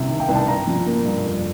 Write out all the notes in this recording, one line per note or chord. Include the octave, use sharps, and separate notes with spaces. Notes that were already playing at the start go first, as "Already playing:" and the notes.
Already playing: C2 C3
D#3
G5
C2
A5
G2 A#5
F3
A#3
G2
F2